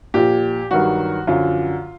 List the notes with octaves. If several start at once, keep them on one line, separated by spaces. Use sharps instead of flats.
A#2 F3 G4
G2 D#3 F#3 F#4
F#2 D3 F3 F4